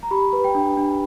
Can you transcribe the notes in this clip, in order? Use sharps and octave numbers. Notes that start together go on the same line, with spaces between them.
A#5
G4 B5
B4
G5
D4
D4